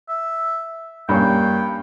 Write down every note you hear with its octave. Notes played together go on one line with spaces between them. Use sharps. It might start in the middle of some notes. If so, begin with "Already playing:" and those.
E5
G2 A#3 C#4 G5